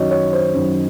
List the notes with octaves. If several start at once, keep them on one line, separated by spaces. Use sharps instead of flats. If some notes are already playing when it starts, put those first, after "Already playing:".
Already playing: F#2 D#3 F#3 F#4 C#5 D#5
C#5
C5
F#2 D#3 F#3